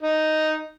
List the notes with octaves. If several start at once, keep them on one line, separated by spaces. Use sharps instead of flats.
D#4